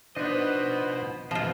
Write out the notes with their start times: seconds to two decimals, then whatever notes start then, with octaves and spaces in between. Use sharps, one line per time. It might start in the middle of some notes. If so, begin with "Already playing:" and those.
0.17 F3 B3 D4 D#4 B4 C5 D#5
1.31 F2 B2 F3 F4